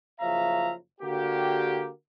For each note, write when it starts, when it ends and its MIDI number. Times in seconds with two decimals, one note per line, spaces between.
0.20 0.73 30
0.20 0.73 49
0.20 0.73 53
0.20 0.73 76
0.20 0.73 77
0.20 0.73 82
1.01 1.89 50
1.01 1.89 58
1.01 1.89 66
1.01 1.89 67